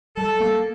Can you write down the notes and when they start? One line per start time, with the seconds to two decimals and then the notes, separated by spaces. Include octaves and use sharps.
0.17 G3 A4
0.40 A#3